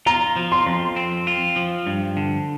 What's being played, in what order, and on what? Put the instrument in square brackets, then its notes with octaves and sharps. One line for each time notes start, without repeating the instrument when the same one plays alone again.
[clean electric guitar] F4 [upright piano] A#5
[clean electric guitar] F3
[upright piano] C6
[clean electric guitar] F2
C4
F4
F3
G2
D3